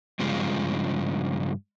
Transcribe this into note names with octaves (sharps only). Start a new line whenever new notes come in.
G2 C#3 F3 G#3